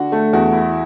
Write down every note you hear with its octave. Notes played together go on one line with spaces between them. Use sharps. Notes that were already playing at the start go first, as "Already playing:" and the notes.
Already playing: D3 F#4
A3
E2 F#4
E4